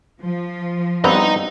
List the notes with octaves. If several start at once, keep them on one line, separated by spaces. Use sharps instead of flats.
F3
G2 B3 C4 D#5 A#5